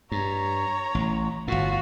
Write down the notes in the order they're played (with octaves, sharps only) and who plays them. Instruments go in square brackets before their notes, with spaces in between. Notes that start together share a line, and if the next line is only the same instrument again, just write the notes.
[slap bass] G2 [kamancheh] C#5 A#5
[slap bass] A1
[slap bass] G1 A2 [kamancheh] F4 F#4